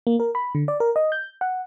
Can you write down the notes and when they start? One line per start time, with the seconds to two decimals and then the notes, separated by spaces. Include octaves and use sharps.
0.07 A#3
0.20 A#4
0.35 B5
0.55 D3
0.68 D5
0.80 A#4
0.96 D#5
1.12 G6
1.41 F#5